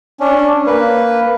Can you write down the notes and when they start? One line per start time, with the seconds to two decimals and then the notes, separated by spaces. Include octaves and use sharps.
0.20 C#4 D4
0.66 A#3 B4